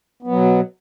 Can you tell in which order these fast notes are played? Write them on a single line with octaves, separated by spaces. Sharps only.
B3 F#3 B2